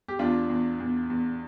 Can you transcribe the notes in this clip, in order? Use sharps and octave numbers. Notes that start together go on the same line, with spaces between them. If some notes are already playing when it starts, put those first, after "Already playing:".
G4
E2 D4 F4
E2
E2
E2